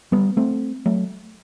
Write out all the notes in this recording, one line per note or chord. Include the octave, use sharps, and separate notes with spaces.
G3 B3
A3 C4
F#3 A3